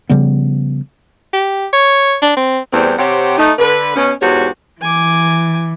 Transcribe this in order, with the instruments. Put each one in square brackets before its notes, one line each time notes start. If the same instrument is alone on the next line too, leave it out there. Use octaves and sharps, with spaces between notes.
[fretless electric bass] C#3 F3 G3 B3
[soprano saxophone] G4
C#5
D4
C4
[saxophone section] E2 A2 G3 C4
C3 C4 G4 C#5 F#5
A3 D#4
D3 B4
B2 C#4
E2 G#2 F#4 G4 C#5
[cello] E3 [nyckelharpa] G#5 D6